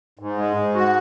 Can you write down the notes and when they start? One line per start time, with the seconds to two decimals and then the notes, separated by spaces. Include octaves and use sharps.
0.19 G#2
0.38 G#3
0.57 G#2
0.75 F#4